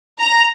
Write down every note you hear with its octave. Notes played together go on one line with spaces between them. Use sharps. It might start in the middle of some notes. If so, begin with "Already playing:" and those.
A#5